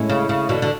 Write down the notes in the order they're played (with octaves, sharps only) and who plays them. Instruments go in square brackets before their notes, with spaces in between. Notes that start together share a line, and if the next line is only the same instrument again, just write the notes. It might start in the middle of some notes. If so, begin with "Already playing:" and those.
Already playing: [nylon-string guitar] A2 G#3 C#4 E4
[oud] C#3
C#3
B2 D3
D3